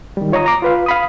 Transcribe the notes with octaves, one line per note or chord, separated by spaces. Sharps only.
D#3 G3
F4 C#5 D#5 A#5 D#6
A#5 D6
F4 B4 F5
F5 B5 D#6